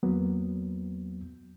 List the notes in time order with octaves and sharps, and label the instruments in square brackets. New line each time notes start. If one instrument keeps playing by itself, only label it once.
[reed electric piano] E2 F#3 A#3 B3